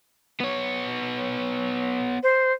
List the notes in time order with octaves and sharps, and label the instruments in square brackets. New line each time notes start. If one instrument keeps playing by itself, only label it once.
[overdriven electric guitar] B3 C#5
[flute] C5